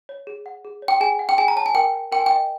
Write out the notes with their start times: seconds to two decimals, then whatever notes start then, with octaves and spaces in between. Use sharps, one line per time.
0.09 C#5
0.27 G#4
0.46 F#5
0.65 G#4
0.82 C#5
0.88 G5
1.01 G#4 G#5
1.19 F#5
1.29 G5
1.38 G#4 G#5
1.48 A#5
1.56 C#5 A5
1.66 G#5
1.75 A#4 G5
1.94 G5
2.12 A#4 G5
2.19 G#5
2.26 D#5 G5